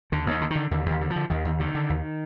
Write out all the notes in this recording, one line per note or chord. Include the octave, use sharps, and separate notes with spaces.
D#2 D3
D#2 D#3
D3
D#3
D3
D#2 D3
D#2 D#3
D3
F3
D3
D#2 D#3
D#2
D3 D#3
D3
D#2